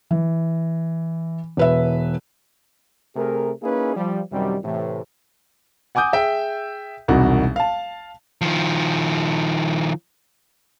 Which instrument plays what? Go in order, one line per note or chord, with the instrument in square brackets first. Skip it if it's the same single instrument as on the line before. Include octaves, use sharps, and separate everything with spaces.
[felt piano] E3
E1 B4 E5
[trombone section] C3 A3 G#4 A#4
A#3 C#4 D#4 E4 G#4 B4
F3 G3
F#2 C3 D#3 G3
A2 C3 E3
[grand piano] F#5 G#5 D6 D#6 G6
G#4 E5 G5
E1 C2 D#4 F#4
F5 A5
[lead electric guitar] D#3 F3